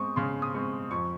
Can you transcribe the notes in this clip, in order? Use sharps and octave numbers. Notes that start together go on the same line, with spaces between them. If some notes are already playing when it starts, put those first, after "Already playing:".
Already playing: G#3 C4 C#6 D#6
C#3 C6
D#6
G#3 C4 C#6
F2 C#6